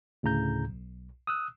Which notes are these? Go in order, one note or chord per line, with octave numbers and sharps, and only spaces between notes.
D2 A2 C#3 A#5 G6
B1
D#6 E6 F#6